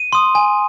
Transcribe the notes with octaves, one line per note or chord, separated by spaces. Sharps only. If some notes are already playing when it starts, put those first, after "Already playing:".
Already playing: D#7
C6 D#6
G#5